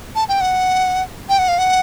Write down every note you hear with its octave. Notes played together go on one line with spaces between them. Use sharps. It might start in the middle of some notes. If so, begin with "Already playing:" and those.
A5
G5
F#5
G5
F#5
F5
F#5